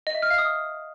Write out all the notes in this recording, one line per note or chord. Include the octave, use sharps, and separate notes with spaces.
D#5
E5
F6
F5
D#6